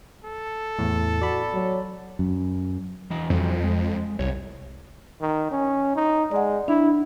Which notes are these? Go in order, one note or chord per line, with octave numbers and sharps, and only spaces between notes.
A4
E2 A2
F#4 D5 B5
F#3
F#2
E2 E3 D#5
F2 F#3 G3 C4
G#3
C2 C#5
D#3
C#4
D#4
G#3 D5 F#5
D4 E4